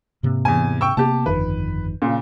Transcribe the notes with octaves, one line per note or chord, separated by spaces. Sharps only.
G#2 C3 A#3
E2 G#5
G5 C#6 E6
C3 A#3 B3 G4 A5
G1 F2 D#3 B4
A#2 C#3